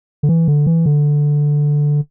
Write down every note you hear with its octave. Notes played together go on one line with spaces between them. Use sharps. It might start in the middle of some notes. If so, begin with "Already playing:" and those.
D3
E3
D3
E3
D3